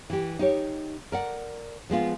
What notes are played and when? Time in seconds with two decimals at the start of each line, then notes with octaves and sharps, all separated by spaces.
0.10 E3 G4
0.39 D#4 G4 C#5
1.12 A#4 D5 F#5
1.90 F3 G#3 B3 F4